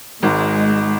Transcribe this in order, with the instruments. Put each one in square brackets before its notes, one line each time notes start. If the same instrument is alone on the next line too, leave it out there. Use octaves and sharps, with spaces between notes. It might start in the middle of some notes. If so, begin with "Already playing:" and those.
[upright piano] G#1 G#2 [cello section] G#3